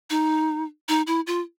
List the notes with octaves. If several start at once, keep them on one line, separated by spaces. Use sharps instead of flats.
D#4
D#4
E4
F4